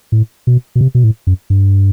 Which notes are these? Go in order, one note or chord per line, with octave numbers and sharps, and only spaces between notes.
A2
B2
B2
C3
B2
A2
F#2
G2